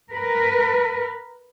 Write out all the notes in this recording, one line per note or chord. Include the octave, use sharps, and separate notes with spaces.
A#4 B4